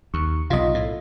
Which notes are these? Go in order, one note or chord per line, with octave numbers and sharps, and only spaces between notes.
D#2 C#6
B1 C3 F4 D#5
A2